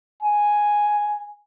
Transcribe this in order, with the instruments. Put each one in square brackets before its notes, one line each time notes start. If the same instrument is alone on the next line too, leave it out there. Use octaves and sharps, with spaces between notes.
[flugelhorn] G#5